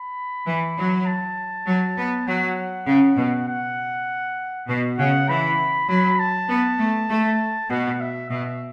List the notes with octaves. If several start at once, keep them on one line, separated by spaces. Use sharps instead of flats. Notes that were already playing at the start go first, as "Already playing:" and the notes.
Already playing: B5
E3
F#3
A5
F#3
B3
F#3 F#5
C#3
B2
F#5
B2
C#3 F#5
E3 B5
F#3 B5
A5
B3
A3
A3
B2 F#5
E5
B2 E5